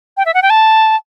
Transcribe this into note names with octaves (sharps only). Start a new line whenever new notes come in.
G5
E5
F#5
G5
A5